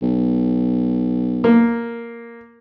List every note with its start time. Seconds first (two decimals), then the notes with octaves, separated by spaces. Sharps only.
0.02 B1
1.44 A#3